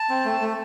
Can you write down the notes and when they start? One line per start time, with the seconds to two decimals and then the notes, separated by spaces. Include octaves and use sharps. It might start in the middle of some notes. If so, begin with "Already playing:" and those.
Already playing: A5
0.09 C4
0.25 A3
0.41 A3